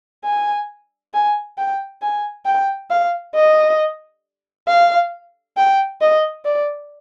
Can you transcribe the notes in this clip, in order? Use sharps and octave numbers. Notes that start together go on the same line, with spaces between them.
G#5
G#5
G5
G#5
G5
F5
D#5
F5
G5
D#5
D5